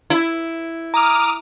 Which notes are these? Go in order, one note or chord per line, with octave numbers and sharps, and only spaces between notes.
E4
A#5 D6 D#6 F6